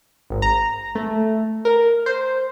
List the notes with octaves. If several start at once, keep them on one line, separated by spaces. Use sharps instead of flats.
G#1
A#5
A3
A#4
C5